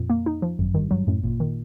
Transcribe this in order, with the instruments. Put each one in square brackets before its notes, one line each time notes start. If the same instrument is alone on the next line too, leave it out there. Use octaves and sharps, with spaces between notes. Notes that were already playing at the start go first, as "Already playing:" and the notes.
Already playing: [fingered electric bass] F2 [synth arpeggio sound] A#2
[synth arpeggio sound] A#3
D#4
F3
[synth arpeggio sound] G#1 [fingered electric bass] F#2
[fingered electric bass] G2 [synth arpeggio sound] D#3
[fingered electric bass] G2 [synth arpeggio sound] F#3
[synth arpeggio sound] F#2 [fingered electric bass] A2
[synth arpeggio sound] G#1 [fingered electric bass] A#2
[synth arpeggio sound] D#3